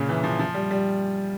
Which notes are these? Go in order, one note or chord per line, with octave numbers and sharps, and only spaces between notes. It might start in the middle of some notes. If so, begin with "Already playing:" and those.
Already playing: A#2 C#3
E3
F3
F3
G3
G3